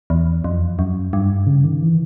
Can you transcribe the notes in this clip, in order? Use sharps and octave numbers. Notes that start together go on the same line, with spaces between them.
E2
F2
F#2
G2
C#3
D#3
E3